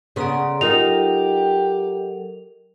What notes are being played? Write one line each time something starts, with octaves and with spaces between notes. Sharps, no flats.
C#3 B3 D5 A#5 C6
F#3 D#4 F4 G4 A4 A#4 D#5 F7